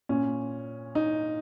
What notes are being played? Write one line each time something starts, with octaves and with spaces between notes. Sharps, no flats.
A#2 C#4
D#4